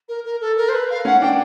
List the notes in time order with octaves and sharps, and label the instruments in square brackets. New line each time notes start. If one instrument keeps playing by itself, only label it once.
[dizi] A#4
A#4
A4
A#4
C5
B4
F5
[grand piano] C#4 [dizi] F#5
[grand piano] D4 [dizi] G5